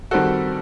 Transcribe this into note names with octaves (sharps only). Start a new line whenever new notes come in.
D#3 G3 C4 F#4 A4